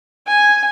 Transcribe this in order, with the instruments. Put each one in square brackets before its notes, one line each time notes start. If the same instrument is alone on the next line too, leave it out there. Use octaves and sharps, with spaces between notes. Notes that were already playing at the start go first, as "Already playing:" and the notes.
[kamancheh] G#5